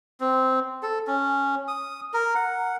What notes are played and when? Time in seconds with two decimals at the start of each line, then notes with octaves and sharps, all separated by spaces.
0.20 C4
0.83 A4
1.07 C#4
1.68 D#6
2.14 A#4
2.35 F#5